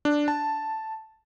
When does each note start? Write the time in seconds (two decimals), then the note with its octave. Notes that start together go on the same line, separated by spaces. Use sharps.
0.05 D4
0.28 A5